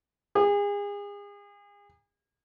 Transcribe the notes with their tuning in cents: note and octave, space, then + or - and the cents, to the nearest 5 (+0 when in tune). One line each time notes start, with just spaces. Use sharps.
G#4 -35